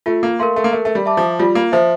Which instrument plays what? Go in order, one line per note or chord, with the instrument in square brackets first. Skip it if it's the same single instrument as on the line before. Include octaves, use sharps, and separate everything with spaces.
[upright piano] A3 [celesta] F4
[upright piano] A#3
[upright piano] A3 [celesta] A#4 F5 C6
[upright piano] A3
A#3
[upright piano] A3 [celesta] A#4
[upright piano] A3
G3
[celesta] E5 A5 D6
[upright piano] F3
[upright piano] G3 [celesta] F4
[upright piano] A#3
[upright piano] F3 [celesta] C5 E5